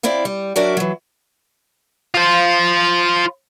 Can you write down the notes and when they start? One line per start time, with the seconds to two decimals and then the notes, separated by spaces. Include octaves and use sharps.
0.03 C4 E4 D5 F5
0.25 G3
0.56 F#3 D4 F#4 A#4 D5 E5
0.77 E3 F#3
2.15 F4 C5